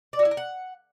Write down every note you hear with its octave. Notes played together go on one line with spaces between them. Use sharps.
D5
F#4
E4
A#4
F#5